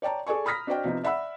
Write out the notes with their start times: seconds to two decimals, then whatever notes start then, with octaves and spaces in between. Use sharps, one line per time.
0.02 C#5 D5 G5 A5 A#5
0.26 G#4 A4 D5 G#5 C#6
0.45 A#5 B5 D#6 F6 A#6 B6
0.67 D4 F#4 C5 D5 D#5 G5
0.84 C3 F3 B3 D#4
1.04 D5 E5 F#5 B5 E6